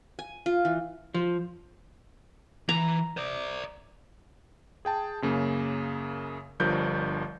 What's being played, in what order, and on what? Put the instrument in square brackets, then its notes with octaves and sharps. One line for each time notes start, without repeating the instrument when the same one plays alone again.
[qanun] G#5
F4
E3
[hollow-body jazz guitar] F3
[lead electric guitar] E3 [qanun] A#5
[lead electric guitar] C5 D5
[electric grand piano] G#4 G5 A5
F#2 C#3 A#3
G1 G2 F3 A#4 G6